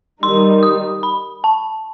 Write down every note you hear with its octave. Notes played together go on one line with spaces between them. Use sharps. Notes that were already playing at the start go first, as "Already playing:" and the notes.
D#3 G3 D#4 C6
D#6
B5
A5